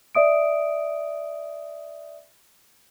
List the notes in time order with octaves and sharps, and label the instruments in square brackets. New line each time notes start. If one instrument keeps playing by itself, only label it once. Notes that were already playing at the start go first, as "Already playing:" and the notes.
[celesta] D5 E5 D#6 D7